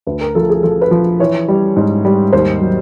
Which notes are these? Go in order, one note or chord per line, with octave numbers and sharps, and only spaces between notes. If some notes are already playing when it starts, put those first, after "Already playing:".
D2 B4
A#4
F3 A4
G#4
F3 A4
B4
F3
E3 C#5
G3
G#2
G3
D#2 C5
F#3